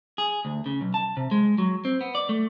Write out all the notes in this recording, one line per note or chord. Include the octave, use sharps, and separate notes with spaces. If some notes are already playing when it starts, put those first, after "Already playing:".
G#4
D2
C#3
B1
A5
C3
G#3
F#3
C4
B3
D5
A3